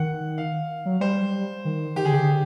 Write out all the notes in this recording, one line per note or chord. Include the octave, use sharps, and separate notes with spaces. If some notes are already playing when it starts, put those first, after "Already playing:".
Already playing: D#3 F#5
F5
F#3
G3 C5
D#3
D#3 G4
D3 G#4
C#3 G4
D3